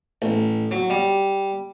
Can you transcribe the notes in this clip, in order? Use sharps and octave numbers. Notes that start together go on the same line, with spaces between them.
A1
F#3
G3